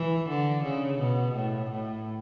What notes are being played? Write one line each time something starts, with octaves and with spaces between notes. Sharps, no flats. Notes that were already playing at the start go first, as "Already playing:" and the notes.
Already playing: E3
D3
C#3
B2
A2
A2